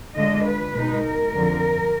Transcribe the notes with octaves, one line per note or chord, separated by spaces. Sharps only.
D3 G#3 D4 F4 D#5
B4
B2 G#3 D#4
A#4
F2 D3 F3